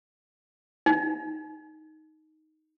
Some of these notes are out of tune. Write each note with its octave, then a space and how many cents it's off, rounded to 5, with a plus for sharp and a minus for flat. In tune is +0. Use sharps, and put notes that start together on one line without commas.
D#4 +5